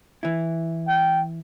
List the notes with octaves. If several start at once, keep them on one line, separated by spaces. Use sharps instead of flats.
E3 E4
G5